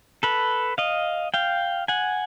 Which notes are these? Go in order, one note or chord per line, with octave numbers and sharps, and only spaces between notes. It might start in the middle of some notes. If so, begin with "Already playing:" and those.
A4 B4
D#5 F5
F5 G5
F#5 G#5